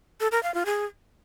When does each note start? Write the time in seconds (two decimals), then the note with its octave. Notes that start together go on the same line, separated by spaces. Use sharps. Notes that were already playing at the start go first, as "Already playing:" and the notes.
0.20 A4
0.32 A#4
0.43 F5
0.54 F4
0.66 G#4